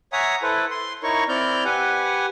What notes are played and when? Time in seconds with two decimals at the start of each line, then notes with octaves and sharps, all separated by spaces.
0.13 C#5 E5 F#5 G#5 A#5 D#6
0.42 E4 A4 B4 C5
0.71 C6
1.03 D#4 E4 A#4 C#5 C#6
1.29 C4 E4 D5 F6 G6
1.65 G4 B4 F#5 G#5